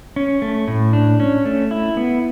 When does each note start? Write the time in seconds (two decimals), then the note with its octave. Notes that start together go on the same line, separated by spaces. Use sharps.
0.16 C#4
0.42 A3
0.68 A2
0.93 D4
1.20 C#4
1.45 A3
1.71 E4
1.97 B3